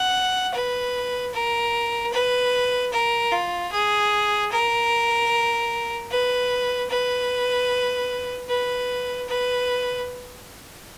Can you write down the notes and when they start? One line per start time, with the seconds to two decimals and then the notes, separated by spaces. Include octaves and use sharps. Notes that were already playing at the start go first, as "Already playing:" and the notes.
Already playing: F#5
0.53 B4
1.34 A#4
2.13 B4
2.92 A#4
3.31 F4
3.72 G#4
4.51 A#4
6.11 B4
6.90 B4
8.49 B4
9.28 B4